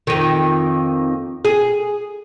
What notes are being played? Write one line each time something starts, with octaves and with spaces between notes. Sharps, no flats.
F2 D#3
G#4